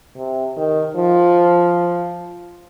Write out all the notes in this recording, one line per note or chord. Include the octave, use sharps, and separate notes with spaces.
C3
D#3
F3